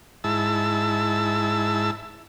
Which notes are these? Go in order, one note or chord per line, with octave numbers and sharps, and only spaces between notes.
G#2 E4 A5 E6